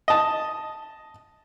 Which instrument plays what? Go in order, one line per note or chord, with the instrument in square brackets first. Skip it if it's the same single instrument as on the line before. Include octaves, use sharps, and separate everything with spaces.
[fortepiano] D#5 A5